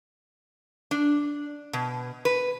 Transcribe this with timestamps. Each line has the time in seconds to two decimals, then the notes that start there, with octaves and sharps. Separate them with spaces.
0.91 D4
1.73 B2
2.25 B4